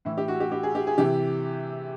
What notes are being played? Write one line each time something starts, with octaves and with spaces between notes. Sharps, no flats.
A2 E3 E4
G4
F#4
G4
G4
G#4
G4
G#4
C3 E3 G4